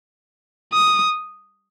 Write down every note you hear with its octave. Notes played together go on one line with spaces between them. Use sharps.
D#6